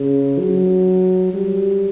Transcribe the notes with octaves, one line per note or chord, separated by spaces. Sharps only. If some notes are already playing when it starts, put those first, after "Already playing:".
Already playing: C#3
F#3
G3